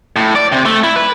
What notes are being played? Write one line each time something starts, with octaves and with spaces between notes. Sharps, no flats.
A2
D5
C3
A3
E4
B4